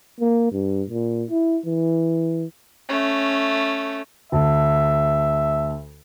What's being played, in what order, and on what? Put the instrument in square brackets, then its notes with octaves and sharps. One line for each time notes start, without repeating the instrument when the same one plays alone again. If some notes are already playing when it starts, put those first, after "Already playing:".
[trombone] A#3
G2
A#2
E4
E3
[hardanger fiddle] A3 C#4
[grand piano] D2 A5 [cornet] E5